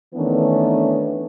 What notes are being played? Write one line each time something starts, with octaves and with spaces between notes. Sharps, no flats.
D#3 E3 A3 B3 C#4 D4